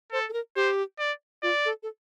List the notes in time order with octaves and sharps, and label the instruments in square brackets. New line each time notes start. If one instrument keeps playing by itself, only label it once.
[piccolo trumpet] A4 [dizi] C5
[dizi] A4
A#4
[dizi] G4 [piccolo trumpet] C5
[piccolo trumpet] D5
[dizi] F4 [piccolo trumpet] D5
[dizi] A4
A4